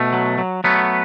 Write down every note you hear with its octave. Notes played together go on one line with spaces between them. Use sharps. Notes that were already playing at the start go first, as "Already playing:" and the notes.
Already playing: B2 A3
F#3
F#3
F#3 A3 B3